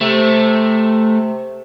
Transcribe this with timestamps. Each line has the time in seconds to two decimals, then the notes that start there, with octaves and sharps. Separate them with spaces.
0.01 C3 A3